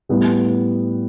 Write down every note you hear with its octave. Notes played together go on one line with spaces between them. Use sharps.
A2 G3 B3